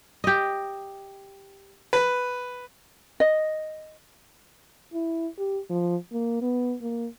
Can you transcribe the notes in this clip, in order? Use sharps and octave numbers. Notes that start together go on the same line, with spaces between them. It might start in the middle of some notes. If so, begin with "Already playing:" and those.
G4 D#5
B4
D#5
E4
G4
F3
A#3
B3
A#3